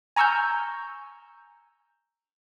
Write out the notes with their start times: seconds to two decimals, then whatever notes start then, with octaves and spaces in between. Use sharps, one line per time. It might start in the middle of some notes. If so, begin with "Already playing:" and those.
0.16 G#5 A#5 C#6 E6 F6 G6